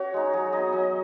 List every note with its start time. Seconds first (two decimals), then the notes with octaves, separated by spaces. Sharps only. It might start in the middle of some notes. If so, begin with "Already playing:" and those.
Already playing: C#4 F#4 C#5
0.14 G#3 D#4
0.33 F#3 G#4
0.53 B3 D#4 D#5
0.73 F#3 D#5